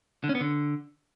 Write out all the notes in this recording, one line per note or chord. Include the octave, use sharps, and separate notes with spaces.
D3
C#4
B3
D3